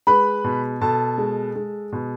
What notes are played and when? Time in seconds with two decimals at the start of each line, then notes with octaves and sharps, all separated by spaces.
0.07 G#3 B4 B5
0.44 B2
0.81 B2 A4 A5
1.18 G#3
1.55 G#3
1.92 B2